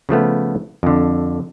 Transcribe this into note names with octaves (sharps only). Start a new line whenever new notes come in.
C#3 F3 A3 B3
F2 D3